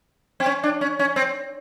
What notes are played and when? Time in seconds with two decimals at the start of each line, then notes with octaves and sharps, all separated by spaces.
0.40 C4
0.46 C#4
0.63 D4
0.81 C#4
0.99 C#4
1.16 C4